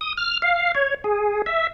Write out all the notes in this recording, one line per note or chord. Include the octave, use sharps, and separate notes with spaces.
D#6
F6
F5
C#5
G#4
E5